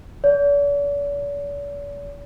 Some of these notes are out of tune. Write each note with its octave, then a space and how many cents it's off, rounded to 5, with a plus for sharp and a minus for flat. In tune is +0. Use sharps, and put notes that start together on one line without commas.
D5 -45